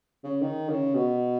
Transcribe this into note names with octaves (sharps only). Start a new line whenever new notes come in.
C#3
D#3
C#3
B2